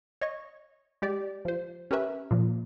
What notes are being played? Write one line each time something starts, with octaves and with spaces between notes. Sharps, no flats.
C#5 D#5 C#6
G#3 G4 D5
F3 C5
C#4 G4 A#4 B4 E5
A#2 F3